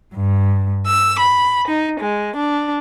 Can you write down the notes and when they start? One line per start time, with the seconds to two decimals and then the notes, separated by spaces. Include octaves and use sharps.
0.16 G2
0.86 E6
1.19 B5
1.68 D#4
2.00 G#3
2.37 D4